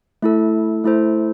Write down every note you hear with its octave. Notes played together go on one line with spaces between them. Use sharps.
A3 E4 A4
A3 E4 A4 C5